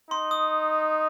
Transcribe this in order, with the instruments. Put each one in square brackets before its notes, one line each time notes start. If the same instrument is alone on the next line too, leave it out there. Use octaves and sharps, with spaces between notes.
[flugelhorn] D#4 [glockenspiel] C6
[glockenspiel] D#6